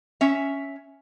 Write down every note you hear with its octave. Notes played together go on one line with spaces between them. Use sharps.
C#4 E5